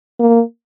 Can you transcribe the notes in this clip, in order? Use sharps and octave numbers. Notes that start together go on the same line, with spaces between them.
A#3